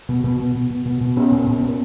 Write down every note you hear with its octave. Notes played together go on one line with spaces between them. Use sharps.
B2
B2
B2
B2
B2
B2
B2
A#2 B3 C#4
A#2
A#2
A#2